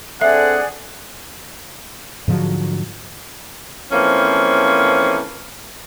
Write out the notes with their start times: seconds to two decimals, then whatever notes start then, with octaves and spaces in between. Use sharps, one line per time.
0.21 C4 D4 G#4 A4 D5 E5 F#5
2.28 G#2 D3 F3 F#3
3.91 E3 F3 A3 A#3 C4 C#4